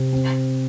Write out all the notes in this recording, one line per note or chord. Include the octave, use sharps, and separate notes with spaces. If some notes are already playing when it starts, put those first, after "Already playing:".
Already playing: C3
C4